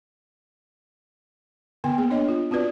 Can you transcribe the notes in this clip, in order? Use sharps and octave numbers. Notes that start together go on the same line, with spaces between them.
D3 B3 G5
A#3 B3 G#4
D4 C#5 D#5
F4
C4 F4 F#4 B4 D5